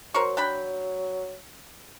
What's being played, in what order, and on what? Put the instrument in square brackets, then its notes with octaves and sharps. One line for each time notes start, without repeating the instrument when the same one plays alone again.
[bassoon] F#3 [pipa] A#4 C5 C#6
[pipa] D4 G5 B5